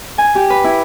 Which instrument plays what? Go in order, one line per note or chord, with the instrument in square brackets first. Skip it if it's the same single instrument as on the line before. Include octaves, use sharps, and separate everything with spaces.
[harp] G#5
G4
B4
E4